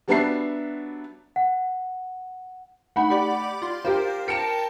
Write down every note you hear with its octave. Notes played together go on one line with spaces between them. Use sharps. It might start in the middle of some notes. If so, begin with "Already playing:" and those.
F#3 G3 B3 D4 E5 C7
F#5
A3 D#4 F#5 B5
G4 D5 D6
F4 C6
F4 G4 A#4 C5
A#4 G5 A5 C#7 E7